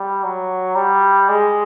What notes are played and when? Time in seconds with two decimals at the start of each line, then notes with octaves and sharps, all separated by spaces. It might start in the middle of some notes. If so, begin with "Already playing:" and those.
Already playing: G3
0.24 F#3
0.75 G3
1.29 G#3